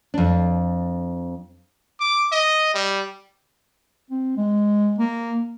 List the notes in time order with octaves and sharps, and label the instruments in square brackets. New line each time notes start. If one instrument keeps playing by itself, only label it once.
[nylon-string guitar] F2 D4
[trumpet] D6
D#5
G3
[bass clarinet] C4
G#3
A#3